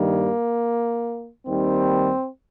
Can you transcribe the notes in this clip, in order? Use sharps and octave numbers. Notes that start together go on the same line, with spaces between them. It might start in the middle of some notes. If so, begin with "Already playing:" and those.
Already playing: G2 D#3 G3 A#3
D#2 D#3 G3 C4